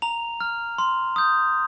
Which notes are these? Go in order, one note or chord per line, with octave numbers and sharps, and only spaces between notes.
A#5 F7
F6
C6
D#6 G6